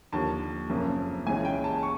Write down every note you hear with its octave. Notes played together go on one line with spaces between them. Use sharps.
D#2 D3 F3 A#3 A5
F#1 F2 C#3 F3 A#3
C#2 C#3 E3 G#3 C#4 G#5
G5
A5
C#6